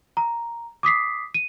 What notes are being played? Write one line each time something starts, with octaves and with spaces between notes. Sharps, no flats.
A#5
D6 D#6 B6 C7
D#7